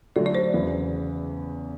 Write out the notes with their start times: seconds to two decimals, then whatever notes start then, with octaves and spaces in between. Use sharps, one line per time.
0.16 D3 F#3 A3 D5
0.26 D5
0.35 C5
0.54 E2 C#3 E3